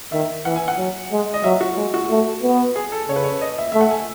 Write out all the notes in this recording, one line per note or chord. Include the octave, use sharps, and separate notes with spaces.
D#3 E5
E3 F#5
G#5
F#5
F#3
G#3
D#5
F#3 E5
F#4
G#3
F#4
A3
B3
G#4
A4
C#3 C#5
B4
C#5
D#5
E5
A3 E5
F#5
G#5